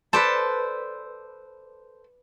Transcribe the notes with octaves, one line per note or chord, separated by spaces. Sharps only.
A4 B4 C5 D5 A5